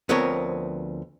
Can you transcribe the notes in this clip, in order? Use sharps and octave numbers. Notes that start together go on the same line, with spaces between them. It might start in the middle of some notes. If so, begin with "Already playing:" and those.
D2 F3 B3 C4 A#4 C#5